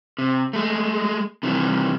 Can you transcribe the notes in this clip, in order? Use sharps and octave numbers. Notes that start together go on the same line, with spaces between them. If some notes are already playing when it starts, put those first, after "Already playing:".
C3
G#3 A3
C3 D#3 E3 G3